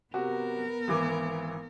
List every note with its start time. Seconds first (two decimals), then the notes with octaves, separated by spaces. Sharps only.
0.14 C3 B3 F#4 A#4
0.88 G#1 E3 D6